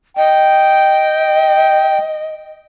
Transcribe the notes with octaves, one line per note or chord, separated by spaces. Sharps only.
D#5 G5